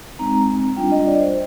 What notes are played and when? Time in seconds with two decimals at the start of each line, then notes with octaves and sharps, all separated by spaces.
0.19 G#3 C4 D#4 A#5
0.77 G3 D4 F4 G5
0.92 D#5
1.06 D5
1.20 C5